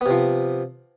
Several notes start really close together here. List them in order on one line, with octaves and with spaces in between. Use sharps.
B3 C3 F3